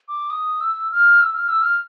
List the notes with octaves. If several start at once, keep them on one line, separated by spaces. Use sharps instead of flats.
D6
D#6
E6
F6
E6
F6
E6
F6